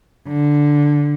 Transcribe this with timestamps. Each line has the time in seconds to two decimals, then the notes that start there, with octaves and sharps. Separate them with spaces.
0.28 D3